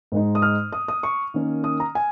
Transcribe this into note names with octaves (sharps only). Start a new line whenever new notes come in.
G#2 G#3 D#4
D#6
F6
D#6
D#6
C#6
D#3 A#3 C#4
D#6
A#5
G#5